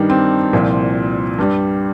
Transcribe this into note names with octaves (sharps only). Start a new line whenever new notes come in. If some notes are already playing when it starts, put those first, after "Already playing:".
Already playing: G2 D#3 G3 D#4
C4
C2 A#2 F3
G2 G3